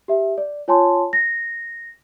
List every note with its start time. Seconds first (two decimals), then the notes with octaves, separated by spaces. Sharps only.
0.08 G4 E5
0.38 D5
0.68 F4 C#5 G#5 A5 C6
1.13 A#6